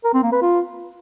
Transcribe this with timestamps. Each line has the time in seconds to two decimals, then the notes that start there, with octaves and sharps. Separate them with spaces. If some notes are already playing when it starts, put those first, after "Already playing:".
0.04 A#4
0.14 C4
0.23 A#3
0.32 B4
0.42 F4